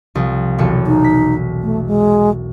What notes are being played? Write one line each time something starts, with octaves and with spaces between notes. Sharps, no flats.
C2 F3
E1 B1 C#7
D#4
B6
A3
G#3